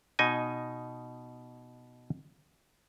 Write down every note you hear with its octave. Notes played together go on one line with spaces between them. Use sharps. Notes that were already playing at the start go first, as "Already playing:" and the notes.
B2 D#4 D#5 G#5